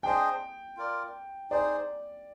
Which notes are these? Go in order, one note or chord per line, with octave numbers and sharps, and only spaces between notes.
D4 G#4 C5 D#5 G5
F4 A#4 D5
D#4 G#4 C5 D5